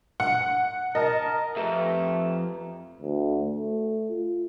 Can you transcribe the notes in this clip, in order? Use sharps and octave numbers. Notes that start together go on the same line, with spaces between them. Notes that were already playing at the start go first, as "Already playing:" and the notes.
F#5
A#4 D#5 A5
F2 A3 G4 B4 A#5
D2
A3
F4